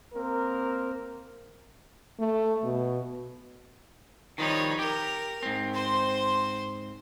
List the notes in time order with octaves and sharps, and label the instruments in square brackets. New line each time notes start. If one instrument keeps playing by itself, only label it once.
[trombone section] A#3 C4 A#4
[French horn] A3
B2
[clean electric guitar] D#3 F3 G3 [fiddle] D#4 C#5
[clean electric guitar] G4 [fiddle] A#4
[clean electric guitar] G#2 C4
[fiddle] C5 C6